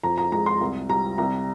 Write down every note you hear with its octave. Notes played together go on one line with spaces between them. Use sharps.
F2 A#5
A#5
G#3 A#5
C6
C2
G3 A#5
C2 A#5